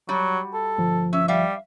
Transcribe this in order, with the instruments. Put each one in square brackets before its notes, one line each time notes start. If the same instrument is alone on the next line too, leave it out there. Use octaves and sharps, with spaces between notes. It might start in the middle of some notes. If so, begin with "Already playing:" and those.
[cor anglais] F#3 [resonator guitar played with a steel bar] G3 F#4
[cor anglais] A4
[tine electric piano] G1 F3
[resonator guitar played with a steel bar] C#4 [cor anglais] E5
[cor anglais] G3 [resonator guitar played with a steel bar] E5 F5